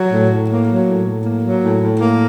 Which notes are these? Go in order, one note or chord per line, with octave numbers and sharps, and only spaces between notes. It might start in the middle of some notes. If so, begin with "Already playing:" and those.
Already playing: F#3
A2
A2
A#3
F#3
A2
A2
A#3
F#3
A2
A2
A#3